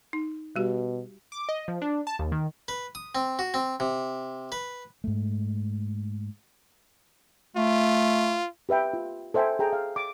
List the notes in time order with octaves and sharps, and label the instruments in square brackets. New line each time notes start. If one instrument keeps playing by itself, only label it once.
[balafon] D#4
[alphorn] B2 [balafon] G3 F#4 G4
[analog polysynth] D6
D#5
F3
D4
A5
D#2
D#3
[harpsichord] B4
D#6
C4
F#4
C4
C3
B4
[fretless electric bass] G#2 A3
[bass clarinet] A3 [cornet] F4
[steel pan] G4 B4 E5 G5
F4
A4 C5 E5 G5 G#5
G#4 A4 G5 A#5
F5
D6